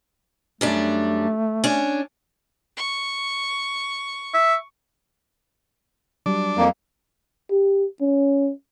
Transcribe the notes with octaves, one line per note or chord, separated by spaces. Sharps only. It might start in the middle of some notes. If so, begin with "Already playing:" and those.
F#2 G3 A3 D4
C#4 D4
C#6
E5
F#3 G3 D4
F2 A#3
G4
C#4